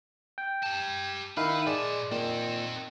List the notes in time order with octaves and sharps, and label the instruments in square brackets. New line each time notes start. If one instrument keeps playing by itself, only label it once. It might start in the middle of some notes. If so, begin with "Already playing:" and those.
[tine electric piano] G5
[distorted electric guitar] G4 A5
[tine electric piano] D#3 D#4 F5 [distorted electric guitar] B3 B4 [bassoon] E4
[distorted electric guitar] A#2 A5 [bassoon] G#3 [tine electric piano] D5
[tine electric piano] A#2 [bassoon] D#3 [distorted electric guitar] C4 A4